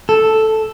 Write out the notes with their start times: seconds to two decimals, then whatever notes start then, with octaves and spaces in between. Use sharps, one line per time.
0.09 A4